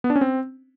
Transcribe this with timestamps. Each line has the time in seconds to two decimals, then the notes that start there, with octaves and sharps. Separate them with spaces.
0.04 B3
0.10 D4
0.16 C#4
0.21 C4